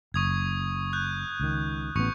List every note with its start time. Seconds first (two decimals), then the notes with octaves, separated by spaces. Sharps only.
0.14 F#1 C#6 D#6 G#6
0.93 F#6 G6
1.40 C#2 D#3
1.96 A1 B3 C#6 D#6 C#7